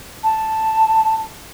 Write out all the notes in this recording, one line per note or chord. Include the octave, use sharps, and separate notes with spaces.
A5